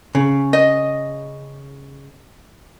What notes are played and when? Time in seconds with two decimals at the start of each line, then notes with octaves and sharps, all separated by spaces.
0.15 C#3
0.53 D#5